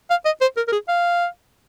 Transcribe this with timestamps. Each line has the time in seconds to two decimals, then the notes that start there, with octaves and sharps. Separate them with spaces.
0.10 F5
0.25 D#5
0.41 C5
0.57 A#4
0.68 A#4
0.72 G#4
0.88 F5